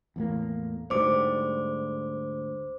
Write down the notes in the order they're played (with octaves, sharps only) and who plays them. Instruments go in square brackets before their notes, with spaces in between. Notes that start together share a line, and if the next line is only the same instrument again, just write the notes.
[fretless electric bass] E2 A2 A#3
[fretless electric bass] D2 G#2 G3 [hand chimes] C5 D6